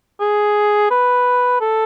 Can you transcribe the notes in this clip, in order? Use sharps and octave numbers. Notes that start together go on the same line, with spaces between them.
G#4
B4
A4